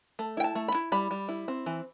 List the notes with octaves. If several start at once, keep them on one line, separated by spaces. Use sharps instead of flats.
A3
E4 G5
A5
A3
B5
E4
G3 B5
G3
E4
C4
E3